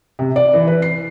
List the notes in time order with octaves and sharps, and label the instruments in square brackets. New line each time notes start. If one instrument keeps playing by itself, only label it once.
[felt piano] C3
D5
E3
B4
C7